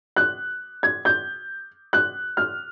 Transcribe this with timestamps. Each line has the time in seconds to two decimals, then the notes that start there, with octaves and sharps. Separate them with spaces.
0.16 F#6
0.83 G#6
1.05 G6
1.93 F#6
2.37 F6